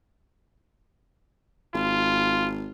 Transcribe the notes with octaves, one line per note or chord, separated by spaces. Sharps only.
G#1 F4